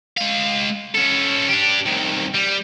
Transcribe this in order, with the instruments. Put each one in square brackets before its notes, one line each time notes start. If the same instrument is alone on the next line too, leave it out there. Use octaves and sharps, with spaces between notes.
[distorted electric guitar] G#3 F5
C#4 A4
D4 G4
C2 D#3
G3